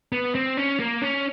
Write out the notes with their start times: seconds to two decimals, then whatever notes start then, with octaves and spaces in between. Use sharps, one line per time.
0.12 B3
0.35 C4
0.57 C#4
0.80 A#3
1.01 C#4